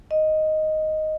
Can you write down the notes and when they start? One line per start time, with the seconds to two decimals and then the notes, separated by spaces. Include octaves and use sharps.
0.11 D#5